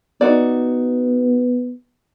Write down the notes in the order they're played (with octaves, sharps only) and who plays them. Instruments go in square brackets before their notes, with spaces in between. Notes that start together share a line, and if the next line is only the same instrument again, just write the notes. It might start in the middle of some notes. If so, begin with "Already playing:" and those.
[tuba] B3 [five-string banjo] D#4 F#4 D5